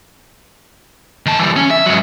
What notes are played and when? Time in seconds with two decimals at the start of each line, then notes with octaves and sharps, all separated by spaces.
1.26 D#3 A5
1.39 E3 G3
1.56 C#4
1.70 E5
1.86 G#2 F#3